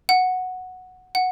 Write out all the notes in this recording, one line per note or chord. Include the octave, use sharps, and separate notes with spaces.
F#5
F#5